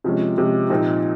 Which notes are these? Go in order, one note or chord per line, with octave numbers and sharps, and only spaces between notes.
C3 F3 G#3 C#4
C3 F3 G#3 C#4
A#2 F3 C4 D#4